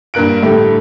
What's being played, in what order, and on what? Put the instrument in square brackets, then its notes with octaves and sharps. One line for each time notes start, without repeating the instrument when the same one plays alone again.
[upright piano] G2 A#2 A#4 F#6 D7
A2 D3 G3 A3 G4